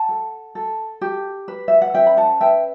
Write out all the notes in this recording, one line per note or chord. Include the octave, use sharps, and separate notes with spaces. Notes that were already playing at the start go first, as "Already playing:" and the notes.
Already playing: F#5 A5
A4
A4
G4
B4
E5
F#5
C#4 E5 G5
B5
F#5 A5
B4 E5 G5